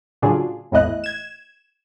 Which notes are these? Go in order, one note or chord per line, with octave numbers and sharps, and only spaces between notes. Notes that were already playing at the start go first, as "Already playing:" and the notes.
A2 C#3 F#3 D4 F4 G#4
G#1 E2 A2 E4 D#5 F#6
G#6 E7